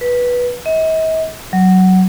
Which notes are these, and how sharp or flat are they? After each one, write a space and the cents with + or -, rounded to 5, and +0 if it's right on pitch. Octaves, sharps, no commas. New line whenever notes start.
B4 -15
D#5 +45
F#3 +15